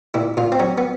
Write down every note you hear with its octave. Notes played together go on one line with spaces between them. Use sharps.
A#2 E4
A#2 F4
C4
F#3 C#4
B3